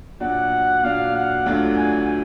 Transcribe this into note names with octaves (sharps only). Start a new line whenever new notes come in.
A#2 F#3 D4 F#4 F#5
A#2 F#3 D4 F#4 F5
F#5
D2 D3 F#3 D4 F4
G#5